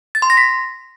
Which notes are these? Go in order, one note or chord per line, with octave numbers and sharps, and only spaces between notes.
A6
C6
A#6
B6